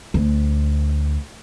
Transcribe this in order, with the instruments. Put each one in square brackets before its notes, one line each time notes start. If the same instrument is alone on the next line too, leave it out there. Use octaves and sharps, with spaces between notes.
[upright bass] D2